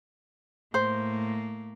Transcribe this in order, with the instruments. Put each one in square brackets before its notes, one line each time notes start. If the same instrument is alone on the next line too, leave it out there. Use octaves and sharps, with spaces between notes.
[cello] A2 A#3 [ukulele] C5